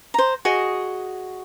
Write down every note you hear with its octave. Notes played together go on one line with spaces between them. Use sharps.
C5 A#5
F#4 G#4 D#5